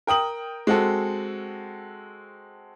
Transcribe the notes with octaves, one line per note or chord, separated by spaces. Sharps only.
A#4 G5 D#6 F#7
G#3 C4 F#4 A4